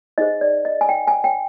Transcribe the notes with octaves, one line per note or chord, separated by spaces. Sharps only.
D#4 G#4 C5 D#5
D5
D#5
G#5
G5
G#5
G5